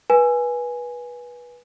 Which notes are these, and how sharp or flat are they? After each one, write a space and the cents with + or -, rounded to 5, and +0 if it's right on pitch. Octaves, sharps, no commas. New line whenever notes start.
B4 -20 G#5 +0